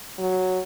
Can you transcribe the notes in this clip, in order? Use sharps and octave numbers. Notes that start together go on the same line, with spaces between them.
F#3